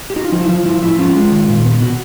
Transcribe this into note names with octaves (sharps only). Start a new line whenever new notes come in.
G4
D#4 F#4
F4
F3 D#4
E4
F3 F4
F3 E4
A2 E4
C#4 F4
G#3
D#3
A#2
B3
B2 F#4